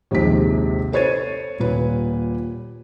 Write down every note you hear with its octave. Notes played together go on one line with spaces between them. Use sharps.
A#1 D#2 C3 G#3 D#4 B6
A4 C5 C#5 G#6 A6 D#7
D#1 A#2 B4